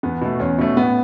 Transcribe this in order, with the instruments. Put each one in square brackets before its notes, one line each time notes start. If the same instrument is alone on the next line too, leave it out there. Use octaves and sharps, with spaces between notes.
[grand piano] E2 [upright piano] B3
[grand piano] B2 A3
[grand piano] E2 [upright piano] C#4
[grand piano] B2 A3 [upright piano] C#4
[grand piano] A2 [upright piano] B3